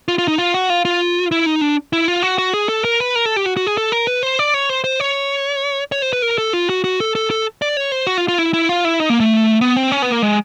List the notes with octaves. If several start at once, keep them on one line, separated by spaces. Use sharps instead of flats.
F4
F4
D#4
F4
F#4
F4
F4
E4
D#4
D4
E4
F4
F#4
F#4
G#4
A4
A#4
B4
A#4
A4
G4
F#4
F#4
G#4
A4
A#4
B4
C5
D5
C#5
C5
C5
C#5
C#5
C5
B4
A#4
A4
F4
F#4
F#4
A4
A4
A4
D5
C#5
C5
F#4
F4
F4
E4
E4
F4
E4
D#4
A#3
A3
B3
C4
C#4
B3
A#3
G#3